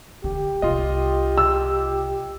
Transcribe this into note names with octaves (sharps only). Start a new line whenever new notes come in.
D3 G4
C2 C3 F4 D#5
E6